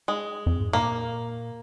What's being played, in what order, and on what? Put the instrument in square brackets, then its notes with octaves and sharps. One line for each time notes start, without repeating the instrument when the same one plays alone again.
[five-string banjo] G#3
[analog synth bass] F2
G#2
[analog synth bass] A#2 [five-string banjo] A#3